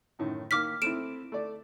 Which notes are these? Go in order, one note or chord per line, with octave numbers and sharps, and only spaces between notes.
F#2 A2 D#3
D#3 A#3 D6 F6 B6
A3 C4 E4 D7 E7
A3 D5